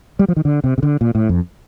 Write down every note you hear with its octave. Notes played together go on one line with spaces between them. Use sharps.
G3
F3
D#3
D3
C3
C3
D3
A#2
A2
F2